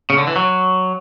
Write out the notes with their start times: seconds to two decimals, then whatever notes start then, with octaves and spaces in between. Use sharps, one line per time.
0.10 C#3
0.18 D3
0.27 E3
0.36 F#3